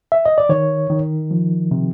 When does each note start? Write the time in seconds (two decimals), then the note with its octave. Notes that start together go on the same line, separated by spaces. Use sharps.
0.12 E5
0.26 D#5
0.38 D5
0.49 D#3 C#5
0.90 D#3
1.31 F3
1.71 C3